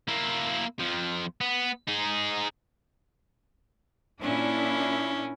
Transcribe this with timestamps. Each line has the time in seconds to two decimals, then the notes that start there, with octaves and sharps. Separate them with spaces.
0.08 A#3 E4
0.79 F2 F3
1.41 B3
1.88 D#4 G#4
4.22 A#2 C#4 D4 E4